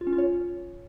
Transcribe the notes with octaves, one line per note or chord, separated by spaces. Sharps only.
F4
C#4
F4
C#5